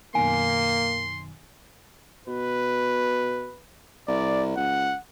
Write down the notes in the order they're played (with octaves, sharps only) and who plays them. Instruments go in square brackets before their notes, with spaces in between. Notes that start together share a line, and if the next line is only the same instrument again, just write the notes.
[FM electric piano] F#2 B2 D#3 [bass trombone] A#3 [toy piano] G#5 [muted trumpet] C6
[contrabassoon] B2 [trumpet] B4
[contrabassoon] C2 [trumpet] D5
[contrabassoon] C#2 [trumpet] F#5